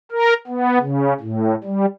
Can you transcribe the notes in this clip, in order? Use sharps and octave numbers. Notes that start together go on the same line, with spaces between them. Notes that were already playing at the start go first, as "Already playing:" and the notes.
A#4
B3
C#3
A2
G3